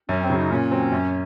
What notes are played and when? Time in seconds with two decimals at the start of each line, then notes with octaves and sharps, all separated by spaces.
0.09 F#2 C#4
0.23 C4
0.30 C#3 F#3
0.37 D#4
0.51 A#2 C#4
0.71 F#3 C4
0.92 F#2